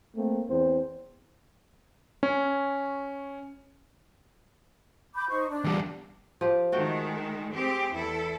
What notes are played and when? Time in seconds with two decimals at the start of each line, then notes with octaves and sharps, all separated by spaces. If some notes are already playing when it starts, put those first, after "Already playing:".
0.16 A3 A#3 C4
0.47 E2 C4 C5
2.23 C#4
5.15 B5 D6 G6
5.29 D#4 C5 C#6
5.49 D4
5.64 E2 G3
6.41 F3 G4
6.72 D#3 G#3 A3 F#4 G5
7.51 C4 G4 G#4
7.92 E2 E4 A4